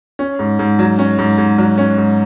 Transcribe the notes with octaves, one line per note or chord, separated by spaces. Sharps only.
C#4
G#2
G#2
F#3
C#4
G#2
G#2
F#3
C#4
G#2